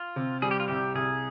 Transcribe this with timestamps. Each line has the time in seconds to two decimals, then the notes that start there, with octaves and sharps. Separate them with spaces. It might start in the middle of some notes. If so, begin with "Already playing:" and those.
Already playing: F4
0.16 C3
0.42 G3 G#4
0.51 G4
0.60 F4
0.68 C2 G4
0.95 C2 G#4